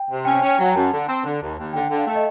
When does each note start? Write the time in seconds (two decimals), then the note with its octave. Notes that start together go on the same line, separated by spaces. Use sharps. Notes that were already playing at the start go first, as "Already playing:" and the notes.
Already playing: G5
0.09 C3
0.25 C#4 G5
0.36 G#5
0.42 C#4
0.47 G5
0.58 F#3
0.67 A#5
0.75 F#2 A5
0.92 D3
1.07 C4
1.24 D3
1.41 D#2
1.58 D#2
1.73 D3 G5
1.90 D3
1.98 F5
2.06 A3
2.15 D#5